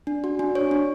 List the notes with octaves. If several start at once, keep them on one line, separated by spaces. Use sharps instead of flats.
D4
F#4
D4
C#5
D4